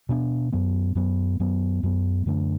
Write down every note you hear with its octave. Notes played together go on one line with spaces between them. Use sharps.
B2 B3 D4
F#2 F#3 B3
F#2 F#3 B3
F#2 F#3 B3
F#2 F#3 B3
F#2 D3 A3 D4